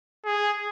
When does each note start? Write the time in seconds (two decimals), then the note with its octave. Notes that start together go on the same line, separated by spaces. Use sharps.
0.26 G#4